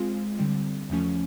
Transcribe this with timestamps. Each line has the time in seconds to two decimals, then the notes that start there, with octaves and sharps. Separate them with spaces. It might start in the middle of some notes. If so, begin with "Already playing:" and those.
Already playing: G#3 C4 F4
0.38 D3 G3 C4
0.90 E2 C#3 F3 A3 C#4